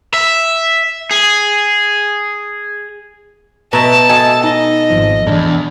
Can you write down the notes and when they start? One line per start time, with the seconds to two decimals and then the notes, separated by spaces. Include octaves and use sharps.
0.14 E5
1.11 G#4
3.73 B2 B4 E5 A5 A#5 C#6
4.09 F#4 A4 D#5 G#5
4.44 D#4 D#5
4.90 G#1 F3
5.27 E2 G#2 D4